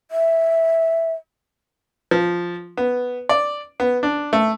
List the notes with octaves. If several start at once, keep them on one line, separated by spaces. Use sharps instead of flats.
E5
F3
B3
D5
B3
D4
A3